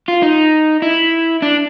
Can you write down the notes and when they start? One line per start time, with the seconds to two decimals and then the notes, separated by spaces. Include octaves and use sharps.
0.08 F4
0.23 D#4
0.82 E4
1.42 D4